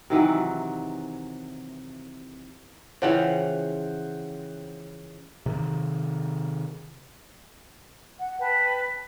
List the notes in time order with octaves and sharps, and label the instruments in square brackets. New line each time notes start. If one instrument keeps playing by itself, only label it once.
[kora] C3 D#3 E3 F#3
[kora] C#3 E3 F3 [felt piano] C5 F#5 G5
[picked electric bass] C3 D#3
[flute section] F#5
[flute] B4 [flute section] G5 A5